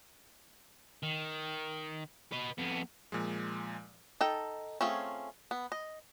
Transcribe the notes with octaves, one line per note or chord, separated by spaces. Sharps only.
D#3
B4 D#5
F2 B3
A#2 F3 G#3
D#4 A4 G5
A3 C4 C#4 F4 G#4
B3
D#5